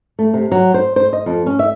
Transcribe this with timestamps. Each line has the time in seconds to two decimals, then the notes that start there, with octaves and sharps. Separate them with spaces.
0.19 A3
0.34 C3
0.52 F#3
0.74 C5
0.96 C5
1.13 D#5
1.26 F2
1.46 C#4
1.59 E5